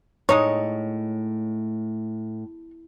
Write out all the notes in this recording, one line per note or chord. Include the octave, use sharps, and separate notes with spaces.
A2 G#3 D#4 C#5